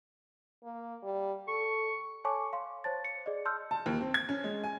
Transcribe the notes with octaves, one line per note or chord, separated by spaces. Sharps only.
A#3
G3
A4 C#6
A4 C#5 G#5 A5 C#6 D6
F5 C6
C5 C#5 A5 A6
C#7
G#4 D5 D#5
A5 C6 E6 F6 G6
A5
D#2
C4
G#6
C#4
G#3
G#5